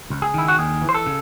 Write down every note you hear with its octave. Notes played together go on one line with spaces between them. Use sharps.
C#2
G#4
D#3 E4
F#4
D#2 G#4
E3
C5
A4
C#3